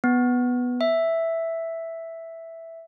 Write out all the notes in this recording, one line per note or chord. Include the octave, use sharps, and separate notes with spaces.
B3
E5